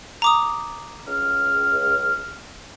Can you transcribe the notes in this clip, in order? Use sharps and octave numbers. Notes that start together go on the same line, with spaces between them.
A#5 D6 D#6
C#2 F6